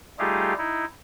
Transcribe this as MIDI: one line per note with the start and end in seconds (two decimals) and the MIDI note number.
0.19 0.54 55
0.19 0.54 57
0.19 0.54 63
0.19 0.54 65
0.19 0.54 67
0.19 0.54 68
0.58 0.85 63
0.58 0.85 64